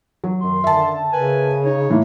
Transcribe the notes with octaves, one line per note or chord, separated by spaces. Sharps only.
F#3
F#2 D#3 C6
D3 E5 A5
C#3 A#4 B4 G#5
D#4 C#5
A2 A#3